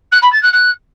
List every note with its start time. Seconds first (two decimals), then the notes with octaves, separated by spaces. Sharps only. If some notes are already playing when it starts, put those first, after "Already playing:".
0.12 F#6
0.22 B5
0.32 A6
0.42 F#6
0.53 F#6